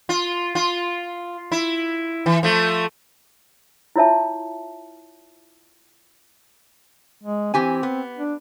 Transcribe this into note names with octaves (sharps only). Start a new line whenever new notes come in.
F4
F4
E4
E3
F3 A3
E4 F4 C#5 E5 A5
G#3
E3 C4 G4 G#5
B3
D4